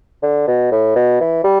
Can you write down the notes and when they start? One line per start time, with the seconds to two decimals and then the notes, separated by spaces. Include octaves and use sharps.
0.23 D3
0.48 B2
0.72 A2
0.96 B2
1.20 E3
1.44 G3